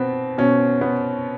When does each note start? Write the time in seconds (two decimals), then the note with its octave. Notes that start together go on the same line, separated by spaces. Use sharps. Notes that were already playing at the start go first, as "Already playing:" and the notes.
Already playing: B2 B3 C4
0.38 B2 C#4
0.81 B3